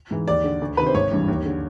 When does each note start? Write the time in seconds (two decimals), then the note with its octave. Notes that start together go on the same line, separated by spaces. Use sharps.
0.11 G#2 E3
0.28 D#2 D5
0.44 D3
0.61 D2
0.77 C3 D#3 B4
0.86 C5
0.95 G#1 C#5
1.12 G2 E3
1.28 D#2
1.45 D3